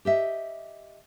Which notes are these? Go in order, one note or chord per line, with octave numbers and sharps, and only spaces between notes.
G4 D#5 E5